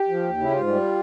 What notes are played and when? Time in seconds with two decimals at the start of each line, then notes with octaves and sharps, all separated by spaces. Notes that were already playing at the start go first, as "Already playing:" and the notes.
Already playing: G4
0.09 F3
0.23 D#2
0.37 C#3 E4
0.52 G#2 F4
0.67 G3